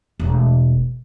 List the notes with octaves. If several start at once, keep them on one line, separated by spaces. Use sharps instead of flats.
E1 A3